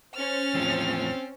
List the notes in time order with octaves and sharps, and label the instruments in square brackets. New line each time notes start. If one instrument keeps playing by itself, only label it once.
[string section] C#4 C5 [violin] F6 A6
[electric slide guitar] E2 A2 F3 [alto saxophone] C4